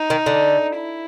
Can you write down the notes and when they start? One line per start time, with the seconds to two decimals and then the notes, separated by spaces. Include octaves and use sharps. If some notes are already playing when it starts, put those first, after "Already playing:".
Already playing: D#4
0.10 D#3
0.26 D3
0.76 E4